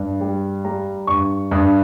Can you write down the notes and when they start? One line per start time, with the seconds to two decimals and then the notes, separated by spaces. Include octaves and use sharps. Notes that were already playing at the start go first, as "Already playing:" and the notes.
Already playing: G2
0.21 G3
0.65 G3 A#5
1.07 G2 C#6
1.51 G2 D#6